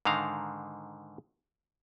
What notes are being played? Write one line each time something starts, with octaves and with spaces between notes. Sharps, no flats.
G#2 D3 D#3 F5 A#5